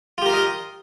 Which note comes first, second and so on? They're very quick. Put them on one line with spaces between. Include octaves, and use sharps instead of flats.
F4 G4 A#4 F5 D#5